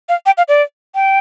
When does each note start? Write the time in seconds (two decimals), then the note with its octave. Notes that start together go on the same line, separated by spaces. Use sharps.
0.09 F5
0.26 G5
0.38 F5
0.48 D5
0.95 G5